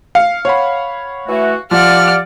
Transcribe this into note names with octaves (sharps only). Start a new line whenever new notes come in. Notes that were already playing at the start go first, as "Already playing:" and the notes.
F5 C#7
C#5 F#5 B5
E3 A3 F#4
F3 F4 G4 D5 F#5 F6